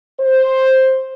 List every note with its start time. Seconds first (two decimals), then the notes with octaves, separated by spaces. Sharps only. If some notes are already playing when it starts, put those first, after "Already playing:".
0.20 C5